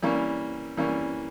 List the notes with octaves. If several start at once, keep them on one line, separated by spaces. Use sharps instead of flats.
E3 G3 A#3 C#4
E3 G3 A#3 C#4